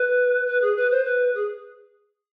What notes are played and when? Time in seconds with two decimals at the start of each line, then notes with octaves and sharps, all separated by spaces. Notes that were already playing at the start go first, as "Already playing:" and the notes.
Already playing: B4
0.46 B4
0.61 G#4
0.76 B4
0.90 C5
1.04 B4
1.34 G#4